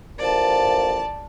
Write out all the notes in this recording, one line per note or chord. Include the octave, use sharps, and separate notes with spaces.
A1 F3 A#4 D5 A5